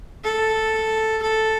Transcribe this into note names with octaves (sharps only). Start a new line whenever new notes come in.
A4
A4